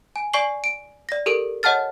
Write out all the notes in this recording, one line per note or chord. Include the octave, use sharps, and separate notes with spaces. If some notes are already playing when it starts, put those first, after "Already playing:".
G#5
D5 G#5 C#6 C7 F#7
D7
D5 A#6
G4 A4 A#4 D7
C#5 D#5 F#5 A5 F6 A6